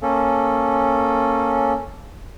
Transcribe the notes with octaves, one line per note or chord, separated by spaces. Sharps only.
A#3 C#4 A4